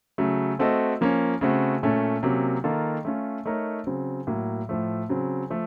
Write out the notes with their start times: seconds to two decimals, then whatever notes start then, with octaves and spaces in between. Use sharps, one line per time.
0.18 C#3 F#3 A3
0.59 A3 C4 F#4 A4 D#5
1.01 F3 A#3 C#4
1.41 C#3 A3 C4 F#4
1.83 A#2 A3 C#4 A4
2.23 C3 F#3 A#3 C#4
2.64 D#3 A#3 F4 A4
3.05 A3 C#4 F4
3.46 A3 D#4 A#4 C#5
3.87 C#3 F#3 C4
4.27 A2 F#3 A#3
4.69 A2 F3 A3
5.09 C#3 F#3 C4
5.50 F3 A3